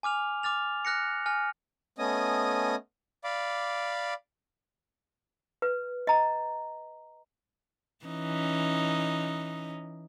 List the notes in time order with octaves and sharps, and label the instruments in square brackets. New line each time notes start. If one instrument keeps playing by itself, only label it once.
[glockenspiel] G#5 D6 F6 F7
D6 F6 A6 F7
F6 F#6 A#6 C#7
G#5 F6
[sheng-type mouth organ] A3 B3 C#4 D#5 G#5 D#6
D5 F5 B5 D6
[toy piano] B4
D#5 A#5
[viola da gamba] E3 C#4 D#4